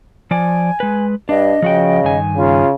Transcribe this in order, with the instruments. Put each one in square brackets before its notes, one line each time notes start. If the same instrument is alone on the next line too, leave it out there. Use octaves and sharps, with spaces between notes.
[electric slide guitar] F3 D5 [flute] G#5
[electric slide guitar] G#3 B4
[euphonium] G2 [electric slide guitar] D4 [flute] D#5
[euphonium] C#3 [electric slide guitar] F3 F#4 G5
[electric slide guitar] G2 D#3 G#5
[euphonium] C#3 [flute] F4